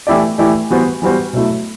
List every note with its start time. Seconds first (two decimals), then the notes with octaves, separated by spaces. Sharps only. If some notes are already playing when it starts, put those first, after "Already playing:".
0.07 E3 A3 E4 G4 D5
0.38 E3 A3 E4 G4 D5
0.70 E3 G3 B3 F#4 C5
1.02 E3 G3 B3 F#4 C5
1.33 B2 F#3 A3 E4